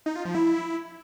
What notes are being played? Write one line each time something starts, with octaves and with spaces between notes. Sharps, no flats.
D#4
F4
F3
E4